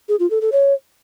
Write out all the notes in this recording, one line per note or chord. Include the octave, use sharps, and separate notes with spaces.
G#4
F4
A4
A4
C#5